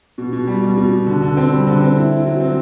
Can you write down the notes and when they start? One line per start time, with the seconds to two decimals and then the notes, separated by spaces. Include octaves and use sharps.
0.18 B2
0.33 B2
0.47 G3
0.63 B2
0.77 B2
0.92 B2
1.07 D3
1.22 D3
1.37 C4
1.51 G3
1.67 D3
1.81 C4
1.96 E4
2.11 E4
2.26 F#3
2.40 C4